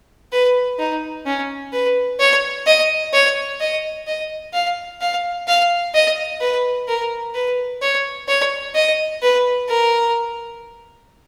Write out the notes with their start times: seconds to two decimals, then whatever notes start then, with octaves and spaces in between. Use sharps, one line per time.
0.32 B4
0.79 D#4
1.26 C#4
1.73 B4
2.20 C#5
2.67 D#5
3.13 C#5
3.60 D#5
4.07 D#5
4.54 F5
5.01 F5
5.48 F5
5.94 D#5
6.41 B4
6.88 A#4
7.35 B4
7.82 C#5
8.28 C#5
8.75 D#5
9.22 B4
9.69 A#4